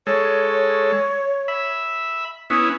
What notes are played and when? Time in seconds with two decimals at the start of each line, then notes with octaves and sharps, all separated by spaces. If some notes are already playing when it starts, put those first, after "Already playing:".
0.07 G#3 A4 C#5
1.48 E5 B5
2.50 B3 C#4 E4 D#6